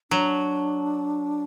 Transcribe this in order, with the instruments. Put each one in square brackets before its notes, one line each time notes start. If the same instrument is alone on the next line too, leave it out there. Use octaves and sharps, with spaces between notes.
[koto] F#3 [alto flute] D4